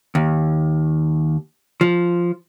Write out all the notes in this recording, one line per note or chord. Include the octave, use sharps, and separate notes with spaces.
D#2
F3